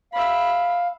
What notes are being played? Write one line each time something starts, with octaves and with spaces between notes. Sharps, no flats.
E5 F5 B5